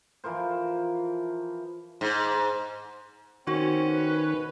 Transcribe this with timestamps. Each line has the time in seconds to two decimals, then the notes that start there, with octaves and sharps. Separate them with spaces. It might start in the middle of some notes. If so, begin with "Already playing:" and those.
0.24 E3 F3 A#4 C5
2.01 G#2
3.47 D#3 C4 C#4 F#4
3.92 B4